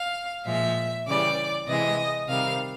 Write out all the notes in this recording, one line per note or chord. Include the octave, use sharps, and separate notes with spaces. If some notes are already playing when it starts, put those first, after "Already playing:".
Already playing: F5
A#2 F3 G#3 E5
C#3 E3 G3 D5
C3 E3 G#3 D#5
C3 D#3 G3 F5